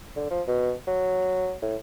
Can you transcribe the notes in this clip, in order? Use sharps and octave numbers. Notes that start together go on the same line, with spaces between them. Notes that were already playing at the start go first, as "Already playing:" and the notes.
D3
F3
B2
F#3
A2